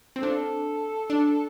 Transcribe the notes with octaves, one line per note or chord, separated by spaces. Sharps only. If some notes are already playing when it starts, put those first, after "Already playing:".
C4
D4 F4 A4
D4